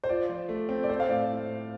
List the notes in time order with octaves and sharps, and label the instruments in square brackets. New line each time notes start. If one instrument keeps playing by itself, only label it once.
[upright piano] C5
[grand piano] F4 [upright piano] D5
[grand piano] F3
A3
C4
[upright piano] D5
[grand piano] A4 [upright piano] C5
[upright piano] F5
[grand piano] A2 [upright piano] D5